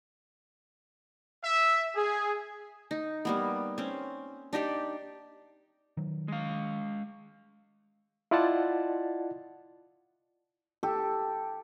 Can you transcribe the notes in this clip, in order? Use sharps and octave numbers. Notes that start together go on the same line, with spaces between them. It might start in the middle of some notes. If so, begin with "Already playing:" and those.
E5
G#4
D#4
G3 A#3 B3
C4 C#4
D4 D#4 G4 D5
D#3 F#3
G#3 F5
E4 F4 D5 D#5 F#5 A5
G4 A4